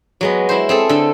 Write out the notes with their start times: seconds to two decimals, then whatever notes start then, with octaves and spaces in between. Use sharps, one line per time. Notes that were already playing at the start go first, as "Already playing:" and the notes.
0.21 F#3 G#3 B3
0.49 E4 C5
0.69 C4 G#4 A4
0.89 D3 A4